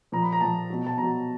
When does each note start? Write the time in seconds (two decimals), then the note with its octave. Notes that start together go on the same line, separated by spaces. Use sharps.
0.12 A#2 F3 A#5
0.22 B5
0.32 A#5
0.41 A#2 F3 A5
0.70 B2 F#3
0.87 A5
0.97 B2 F#3 A#5